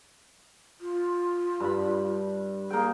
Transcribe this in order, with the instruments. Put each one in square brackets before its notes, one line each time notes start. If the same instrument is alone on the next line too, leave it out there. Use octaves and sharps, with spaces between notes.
[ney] F4
[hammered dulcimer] G2 B5
[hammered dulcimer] A#3 G5 [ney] G#4